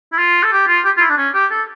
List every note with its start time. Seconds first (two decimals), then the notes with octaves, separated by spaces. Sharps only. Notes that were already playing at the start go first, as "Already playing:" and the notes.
0.12 E4
0.18 F4
0.43 A4
0.52 G4
0.68 F4
0.84 G4
0.97 F4
1.00 E4
1.09 D4
1.18 C#4
1.34 G4
1.51 A4